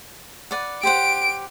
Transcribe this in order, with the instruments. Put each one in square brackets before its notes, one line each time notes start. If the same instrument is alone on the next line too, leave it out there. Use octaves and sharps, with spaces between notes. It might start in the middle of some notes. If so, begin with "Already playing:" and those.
[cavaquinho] B4 D5 F#5
[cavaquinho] G4 C5 F#5 [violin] D7